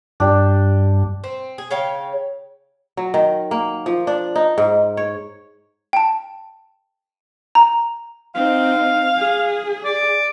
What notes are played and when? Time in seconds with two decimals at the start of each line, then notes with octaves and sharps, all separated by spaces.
0.20 G2 D4 G4
1.24 C4
1.58 G#4
1.71 C#3 C#5 F5 G5
2.97 F#3
3.14 D#3
3.51 A#3
3.86 F3
4.07 D4
4.36 D#4
4.58 G#2
4.97 C#5
5.93 G5 A5
7.55 A#5
8.35 C4 D#4 F5
9.16 G#4
9.84 D5